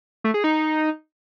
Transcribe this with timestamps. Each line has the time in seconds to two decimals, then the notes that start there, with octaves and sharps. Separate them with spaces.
0.24 A3
0.34 G#4
0.44 D#4